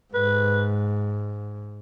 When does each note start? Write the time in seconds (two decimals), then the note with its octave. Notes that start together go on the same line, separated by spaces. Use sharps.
0.14 G#2 B4